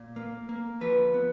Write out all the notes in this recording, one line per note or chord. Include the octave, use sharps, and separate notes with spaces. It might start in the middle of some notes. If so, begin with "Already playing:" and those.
Already playing: A#2
A#3
A#3
F3 B4
B3